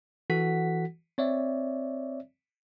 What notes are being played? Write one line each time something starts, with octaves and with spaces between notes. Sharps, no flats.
E3 F#4 A4 F#5 B6
C4 C#5 D5 E5